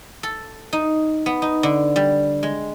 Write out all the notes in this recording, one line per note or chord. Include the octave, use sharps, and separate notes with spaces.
A4
D#4
B3
D#4
D3
G3
G#3